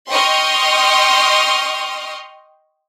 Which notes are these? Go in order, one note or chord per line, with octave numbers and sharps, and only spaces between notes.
D#5 G5 C6 C#6 D#6 F6